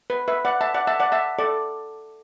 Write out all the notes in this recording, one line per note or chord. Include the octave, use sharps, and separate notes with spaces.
B4
B4 E5
D5 F#5
E5 A5
D5 F#5
E5 A5
D5 F#5
E5 A5
A4 D5